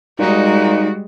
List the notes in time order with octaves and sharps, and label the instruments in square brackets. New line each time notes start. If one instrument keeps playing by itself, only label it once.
[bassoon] A#2 [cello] G3 G#3 [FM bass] D#4 [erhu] F#4